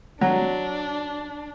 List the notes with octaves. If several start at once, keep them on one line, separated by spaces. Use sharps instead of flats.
F#3 D4